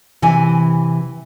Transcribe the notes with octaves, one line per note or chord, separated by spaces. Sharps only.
C3 E3 E5 G#5